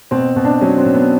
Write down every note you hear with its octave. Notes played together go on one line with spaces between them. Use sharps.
B2 C4
B2
D4
F#3 C#4
C4
B2
B3